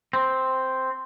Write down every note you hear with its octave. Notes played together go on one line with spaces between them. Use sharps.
C4